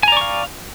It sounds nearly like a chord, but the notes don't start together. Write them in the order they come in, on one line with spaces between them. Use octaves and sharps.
G#5 A#5 D5 C#6 F5